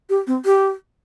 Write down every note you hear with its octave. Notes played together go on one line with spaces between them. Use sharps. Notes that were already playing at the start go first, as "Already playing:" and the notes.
G4
C4
G4